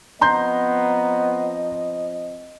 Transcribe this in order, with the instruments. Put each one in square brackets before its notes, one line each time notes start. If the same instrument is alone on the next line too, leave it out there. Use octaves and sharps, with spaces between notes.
[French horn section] F3 C4 D#5 [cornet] B3 [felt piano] A#5 C6 G6